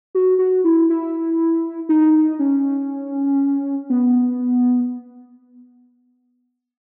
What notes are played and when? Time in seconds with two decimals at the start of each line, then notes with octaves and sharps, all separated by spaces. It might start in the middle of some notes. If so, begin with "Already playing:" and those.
0.15 F#4
0.39 F#4
0.64 E4
0.90 E4
1.89 D#4
2.39 C#4
3.90 B3